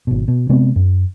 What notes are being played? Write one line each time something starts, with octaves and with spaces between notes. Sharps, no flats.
G#1 B2
B2
C3 G#3 B3 C4
F#2